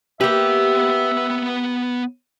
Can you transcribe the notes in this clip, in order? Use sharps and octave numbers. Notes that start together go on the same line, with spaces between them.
A#3 B3 G4 B4 E5